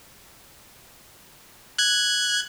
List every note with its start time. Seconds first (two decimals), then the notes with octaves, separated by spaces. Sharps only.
1.78 F#6 G#6